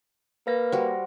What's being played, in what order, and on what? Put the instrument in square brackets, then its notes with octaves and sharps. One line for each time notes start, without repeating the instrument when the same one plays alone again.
[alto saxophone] A#3 [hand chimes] B4 F5 A#6
[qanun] G3 F#4 [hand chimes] C5